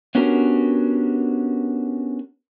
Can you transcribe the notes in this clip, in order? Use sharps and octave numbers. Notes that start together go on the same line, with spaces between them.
B3 C#4 D4 F#4 G4 A#4